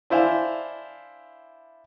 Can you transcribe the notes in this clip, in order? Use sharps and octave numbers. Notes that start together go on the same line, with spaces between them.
D4 E4 C5 F5 G#5